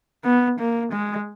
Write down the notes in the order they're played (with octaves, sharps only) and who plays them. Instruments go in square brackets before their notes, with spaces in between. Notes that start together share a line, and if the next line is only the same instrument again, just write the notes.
[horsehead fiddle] B3
A#3
G#3